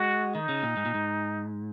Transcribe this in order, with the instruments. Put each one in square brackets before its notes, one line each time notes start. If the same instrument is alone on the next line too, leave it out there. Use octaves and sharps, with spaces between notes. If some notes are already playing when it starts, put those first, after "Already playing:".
Already playing: [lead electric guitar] G#3 [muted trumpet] F#4
[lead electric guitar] D#3 [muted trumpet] D#4
[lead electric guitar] C#3
A#2
G#2
A#2
G#2